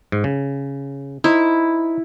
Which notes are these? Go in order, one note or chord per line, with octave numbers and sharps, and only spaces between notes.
G#2
C#3
D#4 E4 C5